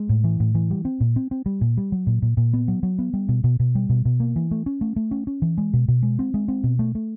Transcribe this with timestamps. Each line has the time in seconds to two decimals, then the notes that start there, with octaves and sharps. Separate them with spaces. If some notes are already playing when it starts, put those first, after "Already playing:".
Already playing: G#3
0.09 A2
0.24 E3
0.40 A2
0.55 E3
0.71 G3
0.85 C4
1.00 A#2
1.16 C4
1.31 C4
1.46 G3
1.61 A#2
1.77 G3
1.92 F#3
2.07 A#2
2.22 A#2
2.37 A#2
2.53 B3
2.68 F#3
2.83 F#3
2.99 B3
3.14 G3
3.29 B2
3.44 B2
3.60 B2
3.75 G3
3.89 B2
4.05 B2
4.20 A#3
4.36 E3
4.51 A3
4.66 C#4
4.81 A3
4.96 A3
5.11 C#4
5.27 C#4
5.42 E3
5.58 G#3
5.73 B2
5.88 B2
6.03 G#3
6.19 C4
6.34 G#3
6.48 C4
6.64 B2
6.79 A3
6.95 A3